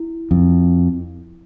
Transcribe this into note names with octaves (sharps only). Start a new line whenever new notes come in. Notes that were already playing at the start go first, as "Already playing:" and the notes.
Already playing: E4
F2